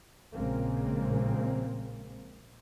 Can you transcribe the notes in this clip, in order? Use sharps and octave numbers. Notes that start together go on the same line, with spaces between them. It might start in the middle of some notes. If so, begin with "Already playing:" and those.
A#1 A#2 C#3 G#3 A#3 C4